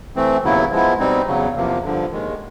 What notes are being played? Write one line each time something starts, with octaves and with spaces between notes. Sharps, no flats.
E3 A3 C4
D#2 C#3 F#3 B3 E4
F3 G#3 B3 E4
B2 G3 C4 D#4
E2 C#3 F#3
E2 C3 F3 A#3
G2 D3 F3
D#2 D#3 G#3